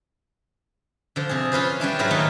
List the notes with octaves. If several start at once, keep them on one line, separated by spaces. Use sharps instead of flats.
D3 F3
C3 G#4
C#4 F4 B4 C5
G3 C#4 D4 E4
G#2 F#3 E4 F#4 F5 B5
D#3 A3 A#3 D#4 F4 A4